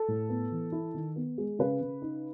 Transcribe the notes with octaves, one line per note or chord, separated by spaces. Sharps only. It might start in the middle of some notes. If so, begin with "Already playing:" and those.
Already playing: A4
A2
B3
E3
E4
D#3
B3
G#3
C#3 B4
C#3
D#4